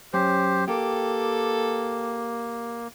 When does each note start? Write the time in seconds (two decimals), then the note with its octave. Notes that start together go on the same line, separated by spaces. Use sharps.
0.14 F#2 C#4 G4 C5
0.68 A#3 G4 A4